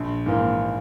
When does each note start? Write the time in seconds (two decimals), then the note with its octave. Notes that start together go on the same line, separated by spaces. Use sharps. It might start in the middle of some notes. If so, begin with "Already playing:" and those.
Already playing: A#1
0.26 G#2 E3 A#3